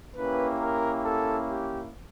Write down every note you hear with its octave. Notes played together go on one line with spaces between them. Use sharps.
A#3 C#4 E4 G4 B4
A#4
A4
G4